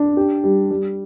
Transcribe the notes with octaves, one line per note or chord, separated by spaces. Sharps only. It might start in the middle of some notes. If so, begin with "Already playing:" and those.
Already playing: D4
G4
G3
G3